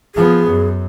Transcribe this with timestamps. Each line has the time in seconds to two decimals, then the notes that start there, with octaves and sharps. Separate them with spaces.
0.15 F3 B3 G#4
0.46 F#2